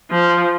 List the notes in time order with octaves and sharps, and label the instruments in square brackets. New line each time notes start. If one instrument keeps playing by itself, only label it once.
[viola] F3